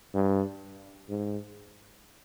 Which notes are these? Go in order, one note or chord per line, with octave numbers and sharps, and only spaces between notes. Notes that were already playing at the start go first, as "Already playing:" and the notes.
G2
G#2